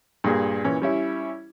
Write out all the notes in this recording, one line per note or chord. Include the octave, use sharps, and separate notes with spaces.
G2 A#2 A#3 G#4
A#2 E3 C#4
G3 C#4 E4